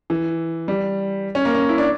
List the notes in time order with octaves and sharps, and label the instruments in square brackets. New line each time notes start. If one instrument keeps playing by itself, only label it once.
[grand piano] E3
G3
C#4
A#3
C#4
E4
D4